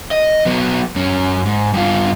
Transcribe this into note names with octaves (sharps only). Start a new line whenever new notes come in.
D#5
F#3 B3
F#2 C#4
G#2
G2 F4